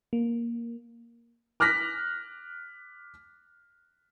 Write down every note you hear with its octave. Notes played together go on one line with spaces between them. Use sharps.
A#3
D6 F6 F#6 A#6 B6